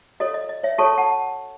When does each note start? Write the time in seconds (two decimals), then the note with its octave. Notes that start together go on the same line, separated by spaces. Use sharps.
0.20 F#4 A4 C#5 D#5
0.34 D#5
0.49 D#5
0.63 C#5 E5
0.78 F#4 A4 C#5 A5 C#6
0.98 F#5 A5